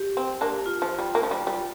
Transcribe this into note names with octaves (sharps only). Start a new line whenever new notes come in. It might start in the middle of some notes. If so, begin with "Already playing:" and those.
Already playing: G4
C4
A#3 D4
F4
F3
G3
A#3
F3
G3
G3